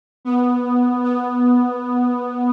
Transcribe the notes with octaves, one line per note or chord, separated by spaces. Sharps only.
B3
B3